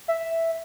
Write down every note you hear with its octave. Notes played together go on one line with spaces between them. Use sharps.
E5